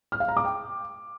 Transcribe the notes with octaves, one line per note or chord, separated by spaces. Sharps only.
F6
F5
A#5
D6
G5